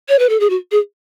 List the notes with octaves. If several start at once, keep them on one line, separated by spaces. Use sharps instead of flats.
C#5
B4
A4
G#4
F#4
G#4